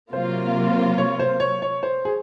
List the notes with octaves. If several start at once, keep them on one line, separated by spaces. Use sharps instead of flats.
C3 F#3 A#3 F4 C5
C#5
C5
C#5
C#5
C5
G#4